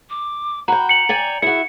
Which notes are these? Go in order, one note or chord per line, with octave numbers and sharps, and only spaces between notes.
D6
F#4 G5 A#5 B5
A#5 C#7 F#7
D5 G5 G#5
E4 F#4 G#4 C#7